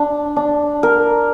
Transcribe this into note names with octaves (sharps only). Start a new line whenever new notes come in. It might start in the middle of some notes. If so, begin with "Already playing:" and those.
Already playing: D4
D4
A#4